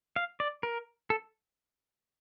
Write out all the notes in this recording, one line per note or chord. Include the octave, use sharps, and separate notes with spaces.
F5
D5
A#4
A4